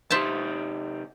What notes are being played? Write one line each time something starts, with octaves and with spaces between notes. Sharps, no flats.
C3 D#4 G4 C5 E5 A5